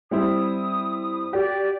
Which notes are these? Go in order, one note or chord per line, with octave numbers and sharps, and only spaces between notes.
G3 C4 E4 D#6
F#4 G4 D5